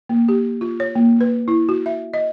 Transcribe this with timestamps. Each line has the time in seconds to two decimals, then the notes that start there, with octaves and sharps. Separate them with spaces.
0.09 A#3
0.29 G4
0.61 F4
0.80 C#5
0.95 A#3
1.21 B4
1.48 E4
1.69 F#4
1.86 E5
2.14 D#5